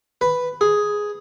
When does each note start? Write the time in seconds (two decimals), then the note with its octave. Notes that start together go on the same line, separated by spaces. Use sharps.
0.21 B4
0.61 G#4